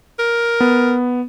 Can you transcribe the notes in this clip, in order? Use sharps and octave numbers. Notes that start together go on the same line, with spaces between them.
A#4
B3